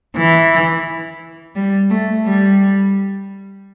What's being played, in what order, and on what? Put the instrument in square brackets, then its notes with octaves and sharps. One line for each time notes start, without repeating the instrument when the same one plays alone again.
[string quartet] E3
G3
A3
G3